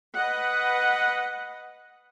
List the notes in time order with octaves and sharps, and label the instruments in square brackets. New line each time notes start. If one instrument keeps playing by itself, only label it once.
[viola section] B4 D#5 F#5